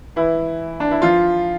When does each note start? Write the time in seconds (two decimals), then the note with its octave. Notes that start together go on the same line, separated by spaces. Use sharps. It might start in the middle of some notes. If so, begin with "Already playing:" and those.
0.16 E3 E4
0.80 D4
0.91 E4
1.02 F3 F4